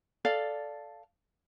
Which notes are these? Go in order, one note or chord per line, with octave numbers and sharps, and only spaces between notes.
A4 D5 F5